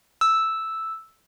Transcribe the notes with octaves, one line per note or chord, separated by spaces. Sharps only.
E6